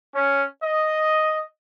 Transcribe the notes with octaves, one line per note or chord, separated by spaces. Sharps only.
C#4
D#5